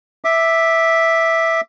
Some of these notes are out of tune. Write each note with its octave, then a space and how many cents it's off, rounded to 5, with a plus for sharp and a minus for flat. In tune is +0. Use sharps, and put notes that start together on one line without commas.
E5 -5 D6 +15